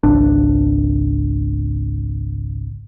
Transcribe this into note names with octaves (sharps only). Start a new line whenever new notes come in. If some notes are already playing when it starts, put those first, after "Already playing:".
G#1 C#2 D4